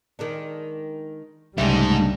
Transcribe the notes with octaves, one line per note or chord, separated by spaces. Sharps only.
D#3 G#3 D4
C2 G#2 C#3 G3 A3 D#4 E5